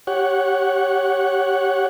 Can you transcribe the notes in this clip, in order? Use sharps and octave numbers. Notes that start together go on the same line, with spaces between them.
G4 C#5 F#5